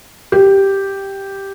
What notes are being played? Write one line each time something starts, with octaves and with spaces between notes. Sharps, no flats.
G4